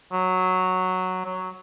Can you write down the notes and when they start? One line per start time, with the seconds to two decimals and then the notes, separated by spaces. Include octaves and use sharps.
0.12 F#3
1.25 F#3